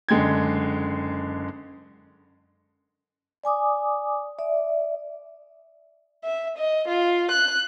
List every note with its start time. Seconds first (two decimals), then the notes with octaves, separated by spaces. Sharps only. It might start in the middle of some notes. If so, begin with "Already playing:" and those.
0.09 F#1 D3 G#3 G5 G#6
3.44 D5 G#5 D6 D#6
4.39 D5 E5
6.24 E5
6.57 D#5
6.88 F4
7.31 F#6